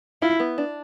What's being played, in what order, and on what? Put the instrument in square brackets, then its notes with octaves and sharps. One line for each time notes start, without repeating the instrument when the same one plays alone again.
[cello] E4 [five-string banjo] F4
[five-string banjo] B3
D4